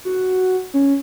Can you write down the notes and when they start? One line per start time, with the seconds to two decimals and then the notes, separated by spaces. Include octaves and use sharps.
0.05 F#4
0.74 C#4